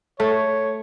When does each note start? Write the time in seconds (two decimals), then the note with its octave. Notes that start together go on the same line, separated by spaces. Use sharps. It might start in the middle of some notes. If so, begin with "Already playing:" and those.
0.20 A3 C#5